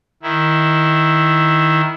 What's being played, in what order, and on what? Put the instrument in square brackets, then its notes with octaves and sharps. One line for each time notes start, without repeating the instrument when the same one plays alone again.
[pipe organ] D#3 E4